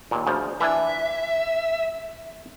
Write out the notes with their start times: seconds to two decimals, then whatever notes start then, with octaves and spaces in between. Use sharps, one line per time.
0.11 D#2 A#2
0.27 D2 C#3 F3
0.61 E3 D4 E5 G#5